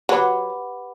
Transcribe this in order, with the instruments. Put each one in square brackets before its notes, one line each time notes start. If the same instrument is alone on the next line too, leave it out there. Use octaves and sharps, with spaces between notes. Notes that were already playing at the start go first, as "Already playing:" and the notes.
[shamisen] F#3 [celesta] G4 B4 F#5 B5 D6